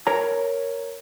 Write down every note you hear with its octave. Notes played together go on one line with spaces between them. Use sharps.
A#4 C#5 A#5